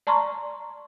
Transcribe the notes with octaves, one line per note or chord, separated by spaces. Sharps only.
D5 A5 A#5 C6 C#6